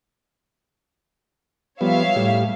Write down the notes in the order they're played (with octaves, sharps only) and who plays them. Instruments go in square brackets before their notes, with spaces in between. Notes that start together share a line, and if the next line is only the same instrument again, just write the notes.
[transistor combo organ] F3 G3 B3 [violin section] C#5 E5 F5
[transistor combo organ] A2 G3